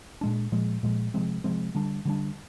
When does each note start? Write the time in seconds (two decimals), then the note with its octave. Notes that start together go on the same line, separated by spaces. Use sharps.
0.21 A#2 G#3 D4
0.52 A#2 F3 G#3
0.83 A#2 F3 G#3
1.14 C3 F3 G#3 C4
1.44 C3 F3 G#3 C4
1.75 D3 G3 D4
2.05 D3 G3 D4